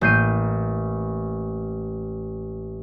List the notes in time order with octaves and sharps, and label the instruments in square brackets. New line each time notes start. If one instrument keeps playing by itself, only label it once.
[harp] A1 A#3 G6 C7 D#7